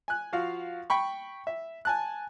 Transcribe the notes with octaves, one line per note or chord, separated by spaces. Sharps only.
G#5 F#6
F3 F#4 F5
G5 B5 C#6
E5
G#5 A5 F#6